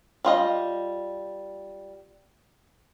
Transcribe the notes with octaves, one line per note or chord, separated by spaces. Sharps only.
G3 F4 D#5